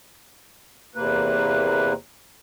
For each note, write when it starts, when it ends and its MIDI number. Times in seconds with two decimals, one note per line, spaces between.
0.95 1.93 40
0.95 1.93 48
0.95 1.93 58
0.95 1.93 71